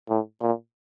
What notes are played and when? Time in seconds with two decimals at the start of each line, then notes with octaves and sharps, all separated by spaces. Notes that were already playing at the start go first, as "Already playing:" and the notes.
0.09 A2
0.41 A#2